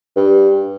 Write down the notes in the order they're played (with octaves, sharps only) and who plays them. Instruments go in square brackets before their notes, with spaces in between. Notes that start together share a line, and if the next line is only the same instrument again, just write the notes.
[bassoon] G2